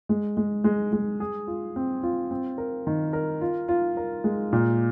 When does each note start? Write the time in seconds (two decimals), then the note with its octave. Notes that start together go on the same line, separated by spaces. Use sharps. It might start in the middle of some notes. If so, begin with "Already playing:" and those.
0.09 G#3
0.37 G#3
0.64 G#3
0.93 G#3
1.20 G#4
1.47 F4
1.76 C4
2.03 F4
2.31 C4
2.58 A#4
2.87 D#3
3.13 A#4
3.41 F4
3.68 F4
3.97 A#4
4.24 G#3
4.53 A#2